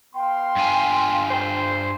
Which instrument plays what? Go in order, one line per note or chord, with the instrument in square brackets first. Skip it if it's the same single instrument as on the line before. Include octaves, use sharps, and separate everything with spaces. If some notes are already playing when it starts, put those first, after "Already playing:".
[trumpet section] B3 F5 C6 [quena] G5
[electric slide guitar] G2 F4 G#5
[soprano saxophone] C5